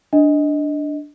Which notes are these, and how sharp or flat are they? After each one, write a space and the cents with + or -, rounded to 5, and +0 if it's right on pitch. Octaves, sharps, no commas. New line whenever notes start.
D4 +0 D#5 +15